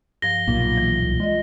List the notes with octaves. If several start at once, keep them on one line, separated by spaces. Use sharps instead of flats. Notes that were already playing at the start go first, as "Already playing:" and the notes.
G2 F3 A#6 G7
B1 A#2 A#3
E3
C2
G#3 F4 D5 D#5